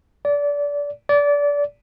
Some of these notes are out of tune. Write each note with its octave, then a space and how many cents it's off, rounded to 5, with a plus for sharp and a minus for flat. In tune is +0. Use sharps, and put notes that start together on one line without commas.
D5 -25
D5 -25